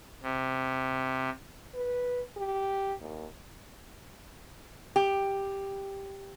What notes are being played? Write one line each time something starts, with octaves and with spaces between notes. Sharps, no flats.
C3
B4
G4
D#2
G4